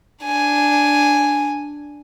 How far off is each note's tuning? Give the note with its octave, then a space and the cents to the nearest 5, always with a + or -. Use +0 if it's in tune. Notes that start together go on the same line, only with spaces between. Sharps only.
D4 +0 G#5 +0